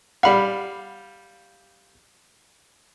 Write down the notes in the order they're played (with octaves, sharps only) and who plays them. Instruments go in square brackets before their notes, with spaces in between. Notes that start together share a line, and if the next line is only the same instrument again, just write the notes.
[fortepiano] G3 F5 [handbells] F#5 B5